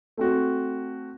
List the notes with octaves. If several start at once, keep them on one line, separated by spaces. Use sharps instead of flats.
A3 C4 F#4